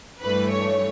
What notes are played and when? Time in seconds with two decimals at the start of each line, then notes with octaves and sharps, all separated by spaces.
0.21 G2 E3 A3 B4
0.51 C#5